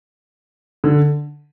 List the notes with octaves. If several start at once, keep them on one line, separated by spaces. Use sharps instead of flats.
D3